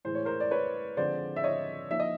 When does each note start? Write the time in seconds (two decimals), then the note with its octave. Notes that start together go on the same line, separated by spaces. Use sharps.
0.05 A2 E3 G#3 C5
0.15 C#5
0.25 A#4 C5
0.40 D5
0.51 B4 C#5
0.97 D3 F3 G#3 C4 C5 D5
1.36 E5
1.44 C#5 D#5
1.91 F3 A#3 D#4 E5
2.00 D#5